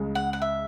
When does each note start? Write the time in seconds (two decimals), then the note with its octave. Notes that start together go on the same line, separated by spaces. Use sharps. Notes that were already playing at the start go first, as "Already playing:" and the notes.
Already playing: C#2 C#3 G#3
0.15 F#5
0.33 F#5
0.42 E5